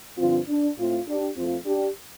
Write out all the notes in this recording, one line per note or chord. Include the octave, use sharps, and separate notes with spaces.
G2 D3 F3 C4 F4
D4
A2 A3 C4 F4
D4 G4
F2 F3 A3 C4 F4
D4 G4